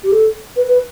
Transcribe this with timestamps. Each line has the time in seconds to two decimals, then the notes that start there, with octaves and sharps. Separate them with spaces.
0.04 G4
0.12 A4
0.56 B4
0.68 B4